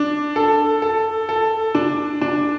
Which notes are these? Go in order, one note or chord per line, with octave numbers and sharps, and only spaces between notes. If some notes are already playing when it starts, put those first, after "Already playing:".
Already playing: D4
A4
A4
A4
D4
D4